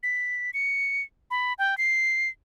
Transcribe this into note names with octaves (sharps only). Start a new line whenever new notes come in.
B6
C#7
B5
G5
C7